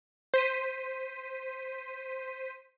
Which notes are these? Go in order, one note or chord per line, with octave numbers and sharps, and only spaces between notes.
C5 B6 D#7